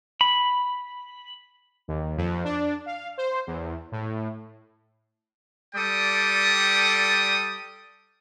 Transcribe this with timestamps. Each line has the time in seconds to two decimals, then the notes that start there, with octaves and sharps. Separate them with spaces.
0.21 B5
1.88 D#2
2.17 F2
2.44 D4
2.86 F5
3.18 C5
3.47 E2
3.92 A2
5.75 G3 A4 D5 G5 D#6